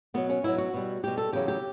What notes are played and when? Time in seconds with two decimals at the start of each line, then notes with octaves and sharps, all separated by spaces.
0.14 B2 F#3 B3
0.29 C#4
0.44 B2 F#3 E4
0.58 F#4
0.74 B2 G3
1.03 B2 G3 G4
1.18 A4
1.32 E2 C#3 F#3 G4
1.48 G4